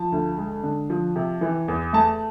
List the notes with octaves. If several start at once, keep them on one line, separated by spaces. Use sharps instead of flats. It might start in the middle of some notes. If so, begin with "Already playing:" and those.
Already playing: F3 A5
D2
G#3
D3
F3
C3
E3
E2
A3 A5